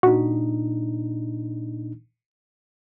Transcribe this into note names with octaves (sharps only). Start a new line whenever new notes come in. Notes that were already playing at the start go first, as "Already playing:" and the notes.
A#2 D4 D#4 F#4